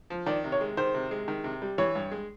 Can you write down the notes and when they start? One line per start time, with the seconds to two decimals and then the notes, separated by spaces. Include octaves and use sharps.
0.10 F3
0.26 D#3 D5
0.44 C3
0.52 C#5
0.61 G#3
0.77 D#3 C5
0.94 C3
1.11 G#3
1.28 D#3
1.44 C3
1.62 G3
1.78 E3 C#5
1.95 G2
2.11 G#3